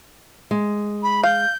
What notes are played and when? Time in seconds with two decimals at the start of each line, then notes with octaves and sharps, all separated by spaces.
0.51 G#3
1.03 B5
1.24 F5 G6